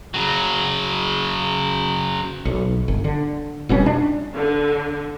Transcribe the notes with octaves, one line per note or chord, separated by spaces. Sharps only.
C#3 F#3
B1
G1
D3
F1 B2 G3 C#4
D4
D3